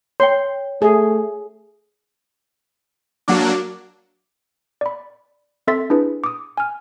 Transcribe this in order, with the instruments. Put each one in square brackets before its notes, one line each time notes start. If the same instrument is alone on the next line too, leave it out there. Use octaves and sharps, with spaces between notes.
[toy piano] C#5 G5 [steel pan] C6
[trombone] A3 [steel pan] G#4
[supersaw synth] F#3 A#3 D4 [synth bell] F#4 F#5 D6
[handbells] D5 B5
C4 A4 E5 C6 A6 B6
D4 E4 G#4 B4
D6 D#6
G#5 F6